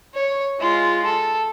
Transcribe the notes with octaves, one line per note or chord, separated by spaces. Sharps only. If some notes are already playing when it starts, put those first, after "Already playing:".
C#5
G#3 F4
A4